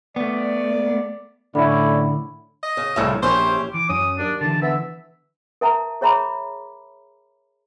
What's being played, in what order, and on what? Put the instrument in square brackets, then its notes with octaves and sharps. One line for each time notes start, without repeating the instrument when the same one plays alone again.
[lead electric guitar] A3 B3 [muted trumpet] D5
[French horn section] A2 [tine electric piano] D3 [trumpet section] C#4 E4 D5 [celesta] E5 B5
[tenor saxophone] D#5
[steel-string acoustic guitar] C#3
[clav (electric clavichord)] C2 A2 E5 [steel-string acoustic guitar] F2 C#3
[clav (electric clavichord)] A#1 [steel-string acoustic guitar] C#4 E4 G4 [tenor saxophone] C5
[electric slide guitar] E3 [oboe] D6
[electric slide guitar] F#2 [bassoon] C#4 [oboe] D#6
[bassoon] D#2 [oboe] D4
[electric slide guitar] D3 E3 [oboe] A5
[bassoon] B3 [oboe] E5
[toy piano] A#4 E5 A5 A#5
G#4 C#5 E5 A#5 B5 D6